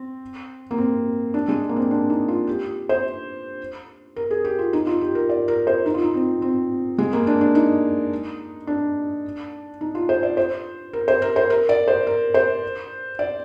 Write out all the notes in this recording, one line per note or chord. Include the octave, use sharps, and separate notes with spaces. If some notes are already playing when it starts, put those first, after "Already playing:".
Already playing: C4
A#3
C4
D4
G#3
A#3
C4
D4
D#4
F4
G4
C5
A#4
G#4
G4
F4
D#4
F4
G4
A#4
D5
A#4
C5
D#4
F4
D#4
C4
C4
G#3
A#3
D4
D4
D#4
D4
D#4
F4
C5
D5
C5
A#4
C5
A#4
C5
A#4
D5
C5
A#4
C5
D5